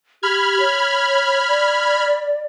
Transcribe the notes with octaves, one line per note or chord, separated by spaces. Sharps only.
G4 B5 F6 G#6
C#5
D5